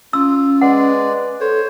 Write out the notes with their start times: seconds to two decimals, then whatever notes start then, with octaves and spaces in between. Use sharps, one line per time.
0.13 C#4 F4 E6
0.61 G#3 B4 D5 F#5
1.41 A4 C5 C#5